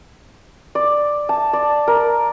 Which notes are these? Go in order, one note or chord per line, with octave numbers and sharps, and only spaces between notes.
D5
A5
D5
A#4